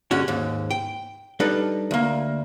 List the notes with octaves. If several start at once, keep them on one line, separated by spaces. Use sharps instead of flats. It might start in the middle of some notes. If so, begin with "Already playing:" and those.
G2 D3 G#3 C#4 F#4
D#2 G#2
G5
G3 D4 D#4 A4 B4
D2 A#3